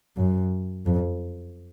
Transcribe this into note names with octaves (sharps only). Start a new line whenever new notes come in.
F#2
F2